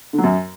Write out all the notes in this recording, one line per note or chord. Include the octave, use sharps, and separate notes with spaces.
D3
F#3
F#2